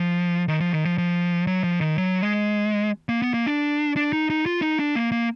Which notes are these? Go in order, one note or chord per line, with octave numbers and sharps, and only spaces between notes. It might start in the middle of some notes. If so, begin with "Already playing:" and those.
Already playing: F3
D#3
F3
D#3
F3
F3
F#3
F3
D#3
F#3
G#3
A#3
B3
A#3
D4
D4
D#4
D#4
F4
D#4
D4
A#3
A#3